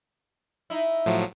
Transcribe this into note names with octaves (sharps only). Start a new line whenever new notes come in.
D#4 E4
A2 F3 F#3